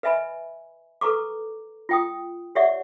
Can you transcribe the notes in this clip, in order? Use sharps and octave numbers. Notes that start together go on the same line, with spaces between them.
B4 D#5 E5 G#5 B5
A4 B4 A#5 C#6 D6
F4 G5 D#6
G4 C#5 D5 E5 F#5 C#6